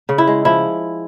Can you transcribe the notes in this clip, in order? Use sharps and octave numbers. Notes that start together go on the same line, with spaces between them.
C#3
E4
G#3
F3 E4